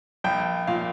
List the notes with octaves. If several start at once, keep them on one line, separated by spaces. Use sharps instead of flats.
A#1 G5
A#2 F5